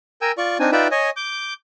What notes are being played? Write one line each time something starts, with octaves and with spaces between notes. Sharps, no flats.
A#4 G5 G#5 E6
F4 D5 C#6
C4 D4 D#4 G#5
D#4 F4 B4 D5 E5 G5
C#5 D#5 G#5
D6 G6